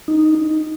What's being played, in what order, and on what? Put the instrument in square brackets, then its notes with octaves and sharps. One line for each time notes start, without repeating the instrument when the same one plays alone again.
[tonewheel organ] D#4